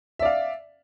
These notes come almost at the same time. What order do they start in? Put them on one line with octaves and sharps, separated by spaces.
E5 D5 F5